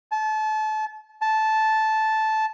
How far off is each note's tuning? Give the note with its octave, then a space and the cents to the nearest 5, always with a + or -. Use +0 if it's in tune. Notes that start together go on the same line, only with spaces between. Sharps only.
A5 -30
A5 -10